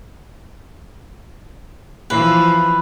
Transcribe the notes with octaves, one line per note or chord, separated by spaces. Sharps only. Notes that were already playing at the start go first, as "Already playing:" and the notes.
E3 F3 B4